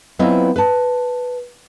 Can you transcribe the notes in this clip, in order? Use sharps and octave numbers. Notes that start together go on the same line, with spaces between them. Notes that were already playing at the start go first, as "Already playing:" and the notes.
F#3 B3 C4 E4 F4 D#5
B4 A5